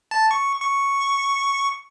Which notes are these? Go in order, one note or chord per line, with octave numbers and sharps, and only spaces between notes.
A5
C#6
C#6